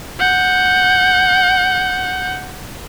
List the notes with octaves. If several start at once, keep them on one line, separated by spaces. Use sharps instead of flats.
F#5 G6